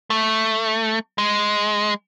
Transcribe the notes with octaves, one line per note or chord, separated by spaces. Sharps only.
A3
G#3